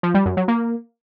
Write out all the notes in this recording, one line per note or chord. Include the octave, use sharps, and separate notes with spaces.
F3
G3
F#2
F#3
A#3